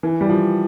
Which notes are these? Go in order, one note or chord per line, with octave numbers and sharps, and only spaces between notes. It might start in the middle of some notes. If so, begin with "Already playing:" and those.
E3
G3
F3